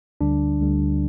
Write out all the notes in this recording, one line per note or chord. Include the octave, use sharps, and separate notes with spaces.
D2 D3 G3 D4
D2 D3 G3